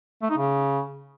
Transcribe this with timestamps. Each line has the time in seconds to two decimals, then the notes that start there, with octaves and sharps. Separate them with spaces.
0.22 A3
0.30 D#4
0.38 C#3